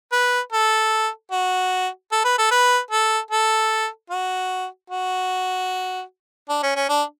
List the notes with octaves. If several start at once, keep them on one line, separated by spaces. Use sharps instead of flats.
B4
A4
F#4
A4
B4
A4
B4
A4
A4
F#4
F#4
D4
C#4
C#4
D4